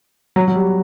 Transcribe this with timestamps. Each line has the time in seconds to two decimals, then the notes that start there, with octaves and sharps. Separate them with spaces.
0.36 F#3
0.48 F#3
0.55 G3